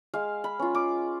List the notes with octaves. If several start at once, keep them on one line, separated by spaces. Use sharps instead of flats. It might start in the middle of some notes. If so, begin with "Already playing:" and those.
G#3 F5
B5
C#4 F4
D6